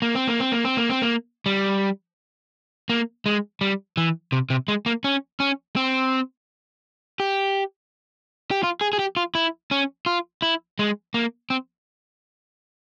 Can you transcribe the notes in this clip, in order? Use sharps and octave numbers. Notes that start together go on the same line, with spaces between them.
A#3
C4
A#3
C4
A#3
C4
A#3
C4
A#3
G3
A#3
G#3
G3
E3
C3
C3
G#3
A#3
C#4
C#4
C4
G4
G4
F4
G#4
G#4
G4
F4
E4
C#4
F4
E4
G#3
A#3
C4